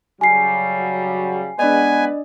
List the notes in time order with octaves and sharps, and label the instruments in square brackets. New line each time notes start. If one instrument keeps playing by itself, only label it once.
[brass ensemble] C#3 F#3 G3 [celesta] G#5 C7
[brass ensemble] G#3 B3 B4 [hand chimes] D4 D5 D#5 [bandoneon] G#5